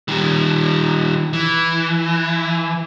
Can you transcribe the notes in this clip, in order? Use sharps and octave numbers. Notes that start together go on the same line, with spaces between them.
D#3 G3
E3